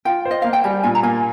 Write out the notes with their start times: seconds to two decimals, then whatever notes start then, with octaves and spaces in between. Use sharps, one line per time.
0.05 F4 G5
0.25 C5
0.31 D#5
0.42 A#3 F5
0.53 G5
0.64 G3 G#5
0.83 A#2 G#5
0.95 A#5
1.03 A#3 G#5